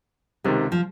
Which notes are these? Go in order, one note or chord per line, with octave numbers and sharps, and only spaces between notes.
C#2 C3 D#3 G#3
F3